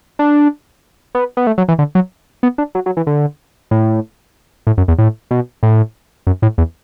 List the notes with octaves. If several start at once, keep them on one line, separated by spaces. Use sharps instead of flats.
D4
B3
B3
A3
F#3
E3
D3
F#3
B3
D4
F#3
F#3
E3
D3
A2
A2
F#2
E2
A2
B2
A2
F#2
A2
E2